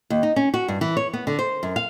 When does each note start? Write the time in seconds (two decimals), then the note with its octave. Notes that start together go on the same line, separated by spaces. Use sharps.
0.10 D#2
0.23 D#4
0.36 C#4
0.54 F#4
0.68 G2
0.81 E3
0.97 C#5
1.13 B3
1.27 D3
1.39 C5
1.63 F#2
1.76 F5